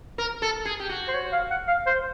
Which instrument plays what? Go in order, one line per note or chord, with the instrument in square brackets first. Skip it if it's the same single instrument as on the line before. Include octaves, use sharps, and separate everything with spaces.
[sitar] A#4
A4
G#4
G4
F#4
[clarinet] C5
C#5
F5
F#5
F5
C5